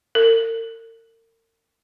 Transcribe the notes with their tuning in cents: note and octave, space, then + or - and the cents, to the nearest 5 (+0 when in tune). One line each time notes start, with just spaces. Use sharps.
A#4 -40